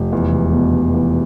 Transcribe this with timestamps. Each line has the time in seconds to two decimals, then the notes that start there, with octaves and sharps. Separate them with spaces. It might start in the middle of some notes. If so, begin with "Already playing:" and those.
Already playing: F1
0.12 E2
0.33 E1
0.53 B2
0.73 E1
0.94 E2